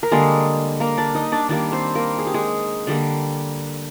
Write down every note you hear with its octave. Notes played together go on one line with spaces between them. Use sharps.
A#4
D3 G3 G#3 A#3 G#4
A#3 A#4
D4 D5
D#4 D#5
D4 D5
D#3 G3 A#3 D4 D5
C4 C5
A#3 A#4
G#4
G4
G#3 G#4
D3 G3 A#3